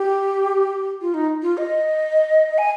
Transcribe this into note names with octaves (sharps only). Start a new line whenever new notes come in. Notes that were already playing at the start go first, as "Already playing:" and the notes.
Already playing: G4
F4
D#4
F4
D#5
G#5